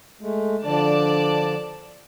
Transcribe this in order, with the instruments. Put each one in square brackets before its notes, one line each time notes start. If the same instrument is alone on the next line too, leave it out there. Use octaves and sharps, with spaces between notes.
[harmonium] G#3 A3
[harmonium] D3 F3 D4 [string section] D5 A5